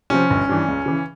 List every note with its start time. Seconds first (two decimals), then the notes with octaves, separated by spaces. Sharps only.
0.10 C3 F3 C#4
0.30 G1
0.49 G2 E3
0.68 C#2
0.86 C#3 E3